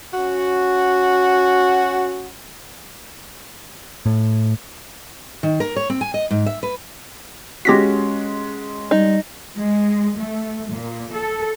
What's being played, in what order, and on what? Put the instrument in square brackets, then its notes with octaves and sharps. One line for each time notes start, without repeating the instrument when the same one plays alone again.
[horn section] C#4 F#4
[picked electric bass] A2
[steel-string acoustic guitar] D#3
A#4
C#5
C4
G#5
D#5
G#2
E5
B4
[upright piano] G#3 C#4 F#4 [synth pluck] G4 A#6 B6
[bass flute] G3 [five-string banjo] D#4
[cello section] G#3
A3
A#2
A4